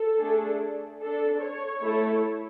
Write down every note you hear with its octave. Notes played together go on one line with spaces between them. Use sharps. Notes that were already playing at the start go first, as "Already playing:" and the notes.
Already playing: A4
A3 D4 G#4
D4 A4
C#5
A3 E4 A4